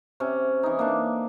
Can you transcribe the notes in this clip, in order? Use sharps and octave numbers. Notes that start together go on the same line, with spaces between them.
C3 C#4
E3 D#4
A#3 D4